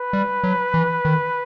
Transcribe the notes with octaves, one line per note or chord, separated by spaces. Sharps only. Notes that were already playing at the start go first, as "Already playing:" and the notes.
Already playing: B4
G3
F#3
E3
D#3